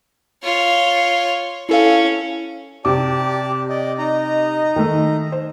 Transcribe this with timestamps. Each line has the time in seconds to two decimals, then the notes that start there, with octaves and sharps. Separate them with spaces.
0.43 F4 C#5
1.69 C#4 E4 A4 F5
2.85 C3 G4 D5 A5 D6
3.69 D5 D#5
3.98 D#4 D#5 A#5
4.76 D#3 A3
5.32 C5